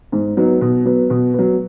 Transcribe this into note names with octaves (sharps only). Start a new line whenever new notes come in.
G#2
F#3 B3 D#4
B2
F#3 B3
B2
F#3 B3